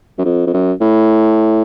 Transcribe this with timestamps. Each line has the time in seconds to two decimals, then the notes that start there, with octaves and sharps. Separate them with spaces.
0.18 F#2
0.24 F2
0.47 F2
0.53 F#2
0.81 A2